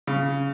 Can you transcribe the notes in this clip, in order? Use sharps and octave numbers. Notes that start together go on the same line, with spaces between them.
C#3